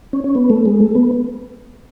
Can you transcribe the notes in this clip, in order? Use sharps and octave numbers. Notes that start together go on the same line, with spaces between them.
C#4
C#4
B3
A3
G#3
A3
B3